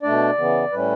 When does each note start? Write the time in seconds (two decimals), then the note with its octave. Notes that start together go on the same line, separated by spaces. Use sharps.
0.03 B2 A3 D4 D5
0.38 C#3 E3 B3
0.72 A2 G3 C#4 B4